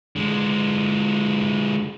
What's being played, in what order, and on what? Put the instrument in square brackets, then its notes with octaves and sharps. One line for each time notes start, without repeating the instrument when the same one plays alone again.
[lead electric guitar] D3 G#3